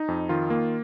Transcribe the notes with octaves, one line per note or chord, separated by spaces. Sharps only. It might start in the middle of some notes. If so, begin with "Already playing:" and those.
Already playing: D#4
F2
D#3 F4
A#3